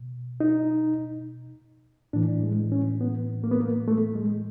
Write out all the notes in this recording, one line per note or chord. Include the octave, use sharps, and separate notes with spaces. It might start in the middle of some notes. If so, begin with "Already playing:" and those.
Already playing: B2
D#4
A2 E3 D4
G#3
C#4
B3
A#3
B3
A#3
A3
G#3